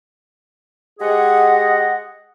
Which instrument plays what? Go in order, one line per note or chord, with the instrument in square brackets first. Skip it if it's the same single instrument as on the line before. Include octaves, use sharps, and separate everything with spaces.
[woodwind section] G#3 G4 G#4 D#5 F#5